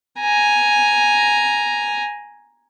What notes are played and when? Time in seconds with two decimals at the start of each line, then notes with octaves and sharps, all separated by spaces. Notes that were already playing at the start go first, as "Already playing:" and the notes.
0.20 G#5 A#5